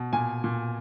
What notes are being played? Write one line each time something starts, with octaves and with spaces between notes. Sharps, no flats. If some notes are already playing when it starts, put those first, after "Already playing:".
Already playing: B2
A#2 G#5
A#2